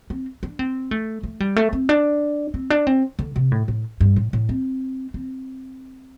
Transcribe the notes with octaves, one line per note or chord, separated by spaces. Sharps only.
C4
D4
C4
A3
A3
G3
A3
C4
D4
C4
D4
C4
D3
C3
A2
A2
G2
A2
A2
C4
C4